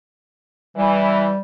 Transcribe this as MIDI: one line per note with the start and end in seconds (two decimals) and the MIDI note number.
0.77 1.29 52
0.77 1.40 55